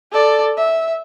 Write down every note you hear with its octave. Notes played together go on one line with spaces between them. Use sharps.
A4 D5
E5